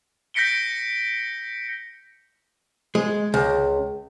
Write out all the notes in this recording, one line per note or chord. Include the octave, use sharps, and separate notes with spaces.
G6 A#6 B6 C#7 D7 G7
G#3
C#2